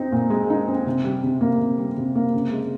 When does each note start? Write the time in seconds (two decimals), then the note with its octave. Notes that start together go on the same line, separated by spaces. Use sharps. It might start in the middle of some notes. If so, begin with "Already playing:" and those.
Already playing: C4 D#4
0.12 A#2
0.30 G#3
0.50 D#4
0.68 C4
0.86 C3
1.04 G3
1.23 C3
1.41 A#3
1.60 C3
1.78 G3
1.97 C3
2.16 A#3
2.34 C#3
2.52 G#3